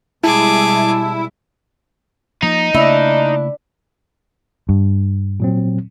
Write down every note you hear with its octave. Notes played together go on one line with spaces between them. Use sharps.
B2 G3 G#3 E4 G#4 A5 D6
F3 A#3 D#4
C#3 A3 A#3 D4 E4
G2
A#2 F#3 C4